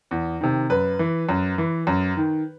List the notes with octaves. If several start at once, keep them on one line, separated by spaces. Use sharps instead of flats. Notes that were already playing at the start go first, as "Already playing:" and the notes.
E2
C3 D#3
F#2 B4
E3
F#2
E3
F#2
D#3